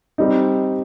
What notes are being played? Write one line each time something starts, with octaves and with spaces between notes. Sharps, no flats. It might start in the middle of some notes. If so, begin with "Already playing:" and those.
G3 C4 D#4